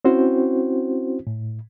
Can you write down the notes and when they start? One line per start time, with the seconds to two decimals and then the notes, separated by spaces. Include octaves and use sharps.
0.05 C4 C#4 E4 F#4 C5
1.27 A2